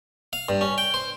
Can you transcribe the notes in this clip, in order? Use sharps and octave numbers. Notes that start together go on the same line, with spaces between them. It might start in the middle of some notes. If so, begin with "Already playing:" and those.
F5
G2
C#4
G5
C5